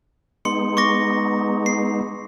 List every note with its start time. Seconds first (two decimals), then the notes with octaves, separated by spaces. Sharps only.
0.45 G#3 B3 D#4 C6 C#7
0.77 C#6 D6 A#6
1.66 C7